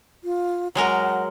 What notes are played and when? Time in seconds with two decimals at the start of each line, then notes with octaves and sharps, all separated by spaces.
0.24 F4
0.75 F#3 G#3 A#4 F#5